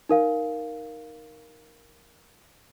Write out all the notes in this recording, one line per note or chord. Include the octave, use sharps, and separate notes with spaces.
D#4 A#4 F5